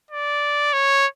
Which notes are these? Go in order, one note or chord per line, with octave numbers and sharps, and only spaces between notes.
D5
C#5